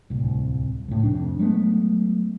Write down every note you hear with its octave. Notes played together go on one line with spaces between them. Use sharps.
D1 C2
C#2 A2
F1 F2 D4
F#3 G#3 A3 B3